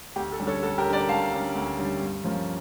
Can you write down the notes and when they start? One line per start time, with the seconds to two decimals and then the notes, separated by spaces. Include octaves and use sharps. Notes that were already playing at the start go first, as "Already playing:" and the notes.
0.16 D2 G4
0.32 A4
0.39 D3 G3 C#4
0.47 A4 C#5
0.62 D2 A4
0.78 G4 A#4
0.85 D3 G3 C#4
0.93 A#4 D5
1.08 D2 F5 A5
1.32 D3 G3 C#4
1.55 D2
1.78 D3 G3 C#4
2.01 G2
2.24 F3 A#3 C#4